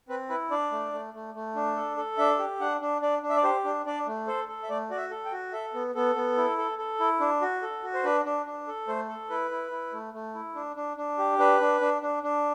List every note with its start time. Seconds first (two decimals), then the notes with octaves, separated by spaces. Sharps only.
0.09 C4 B4
0.30 E4 B4
0.51 D4 D5
0.72 A3
0.92 A3
1.14 A3
1.34 A3
1.55 D4
1.76 A4
1.97 A4
2.18 D4 E5
2.39 G4
2.60 D4 F#5
2.81 D4
3.02 D4 D5
3.22 D4
3.29 E5
3.36 D5
3.43 G4 C5
3.64 D4
3.86 D4 D5
4.07 A3
4.27 A4 C5
4.48 A4
4.63 E5
4.69 A3 D5
4.90 F#4 D5
4.97 E5
5.11 A4
5.25 G5
5.32 F#4
5.53 A4 E5
5.74 B3
5.95 B3 A4
6.15 B3
6.37 E4
6.58 A4
6.78 A4
7.00 E4
7.20 D4
7.41 F#4
7.62 A4
7.83 F#4
7.94 C5
8.04 D4 B4
8.25 D4
8.46 D4
8.67 A4
8.88 A3 C5
9.08 A4
9.30 E4 B4
9.51 E4
9.71 E4
9.93 A3
10.14 A3
10.35 E4
10.55 D4
10.76 D4
10.97 D4
11.18 G4
11.39 D4 B4
11.60 D4
11.81 D4
12.02 D4
12.23 D4